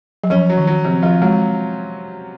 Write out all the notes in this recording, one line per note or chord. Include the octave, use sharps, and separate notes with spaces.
F#3
F3 C#4
F#3
D#3
F#3
C3 F3
F3 F4
F#3 G#3